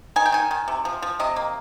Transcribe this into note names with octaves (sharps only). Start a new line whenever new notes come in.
D#3 G#5
G5
D#3 G#5
D#3
C3
F3
F3
C3 D#5
A#3